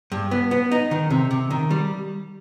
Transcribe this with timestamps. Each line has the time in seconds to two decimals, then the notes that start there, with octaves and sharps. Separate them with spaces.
0.12 G2
0.31 B3
0.51 B3
0.71 D#4
0.91 D#3
1.11 C3
1.31 C3
1.51 D#3
1.71 G3